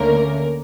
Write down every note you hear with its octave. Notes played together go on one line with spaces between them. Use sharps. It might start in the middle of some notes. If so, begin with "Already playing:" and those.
Already playing: D2 D3 A3 A#3 C#4 A#4